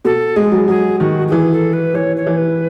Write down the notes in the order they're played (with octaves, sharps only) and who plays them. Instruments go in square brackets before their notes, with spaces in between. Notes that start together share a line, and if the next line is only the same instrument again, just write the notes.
[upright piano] B2 [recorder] A4
[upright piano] G#3 [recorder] G#4
[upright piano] F#3
[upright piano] F#3 [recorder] G#4
[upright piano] D#3 [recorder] F#4
[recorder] F#4
[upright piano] E3 [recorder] G#4
[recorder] A4
B4
[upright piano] E3 [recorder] C#5
[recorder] C#5
[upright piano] E3
[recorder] B4